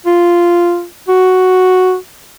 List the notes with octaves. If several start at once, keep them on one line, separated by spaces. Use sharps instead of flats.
F4
F#4